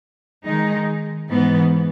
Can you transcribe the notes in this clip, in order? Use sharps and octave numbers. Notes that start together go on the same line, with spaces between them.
D#3 G#3 D#4
G#2 E3 B3